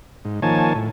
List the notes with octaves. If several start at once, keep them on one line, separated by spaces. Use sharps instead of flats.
G#2
D#3 F3 A#3 C#5 G#5 A5
A2